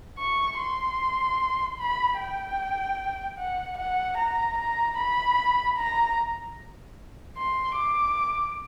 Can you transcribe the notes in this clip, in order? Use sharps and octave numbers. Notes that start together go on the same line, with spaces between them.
C#6
C6
B5
G5
F#5
F#5
A#5
A#5
B5
A#5
C6
D6